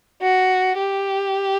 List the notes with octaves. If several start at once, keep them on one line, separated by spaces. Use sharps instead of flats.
F#4
G4